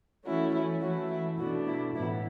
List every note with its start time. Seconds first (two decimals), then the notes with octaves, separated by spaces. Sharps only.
0.25 E3 A3 C#4 E4 F#4
0.53 E4
0.81 E3 A3 E4 F#4
1.10 E4
1.38 B2 A3 D4 F#4
1.67 E4
1.95 A2 E3 B3 E4